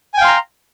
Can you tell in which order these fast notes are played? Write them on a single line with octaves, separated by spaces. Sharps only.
G#5 G5 F5 C6 A#5